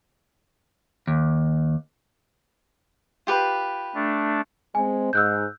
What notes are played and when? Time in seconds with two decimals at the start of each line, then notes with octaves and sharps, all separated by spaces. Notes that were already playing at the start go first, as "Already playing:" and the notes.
1.07 D#2
3.27 F4 G4 B4
3.95 A3 D4
4.75 G#3 C4 G#5
5.13 G#2 E6 F#6 G6